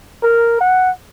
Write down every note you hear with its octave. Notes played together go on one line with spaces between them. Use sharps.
A#4
F#5